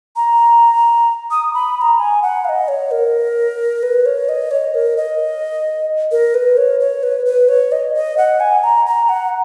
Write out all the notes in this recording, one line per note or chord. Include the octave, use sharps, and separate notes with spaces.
A#5
D#6
B5
B5
A#5
G#5
F#5
F5
D#5
C#5
A#4
B4
C#5
D#5
C#5
A#4
D#5
A#4
B4
C#5
C#5
B4
B4
C#5
D#5
D#5
F#5
G#5
A#5
A#5
F#5